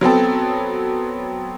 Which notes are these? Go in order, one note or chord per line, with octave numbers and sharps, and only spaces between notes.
F#3 B3 C4 A4